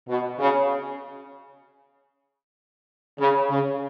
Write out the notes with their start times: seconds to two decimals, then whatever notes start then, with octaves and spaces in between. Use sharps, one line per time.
0.09 B2
0.39 C#3
3.19 C#3
3.50 C#3